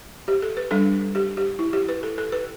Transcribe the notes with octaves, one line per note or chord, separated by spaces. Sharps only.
G4
A4
B4
G3 D4 A4
G4
G4
E4
G4
B4
A4
A4
B4